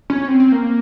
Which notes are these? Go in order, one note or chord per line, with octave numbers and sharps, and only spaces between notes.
C#4
C4
C4
A#3